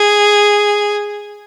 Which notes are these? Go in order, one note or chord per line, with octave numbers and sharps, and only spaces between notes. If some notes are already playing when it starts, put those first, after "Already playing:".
Already playing: G#4